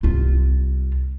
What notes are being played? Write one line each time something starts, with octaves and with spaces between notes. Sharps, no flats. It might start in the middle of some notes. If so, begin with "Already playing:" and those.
C2 F4